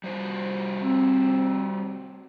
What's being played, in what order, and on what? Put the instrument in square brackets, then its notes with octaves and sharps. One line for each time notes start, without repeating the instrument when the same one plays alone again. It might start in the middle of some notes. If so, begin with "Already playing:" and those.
[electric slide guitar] G3 F#4 C5
[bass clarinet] C4